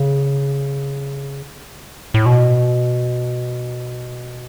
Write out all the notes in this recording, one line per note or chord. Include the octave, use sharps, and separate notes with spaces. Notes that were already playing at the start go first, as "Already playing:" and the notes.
Already playing: C#3
A2
B2